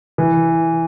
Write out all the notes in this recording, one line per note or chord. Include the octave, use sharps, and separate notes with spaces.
E3